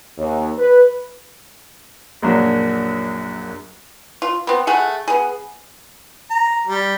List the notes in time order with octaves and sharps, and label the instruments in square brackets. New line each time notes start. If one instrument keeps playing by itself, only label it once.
[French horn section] D#2
B4
[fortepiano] A#1 F#2 F#3 A#3 D4
[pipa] F4
B3 C4
A3 G#4 F#5
B3 G#4
[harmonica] A#5
G3